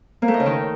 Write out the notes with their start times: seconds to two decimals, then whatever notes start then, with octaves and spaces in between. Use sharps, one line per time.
0.22 A#3
0.28 A3
0.34 D#4
0.40 C#3
0.46 D#3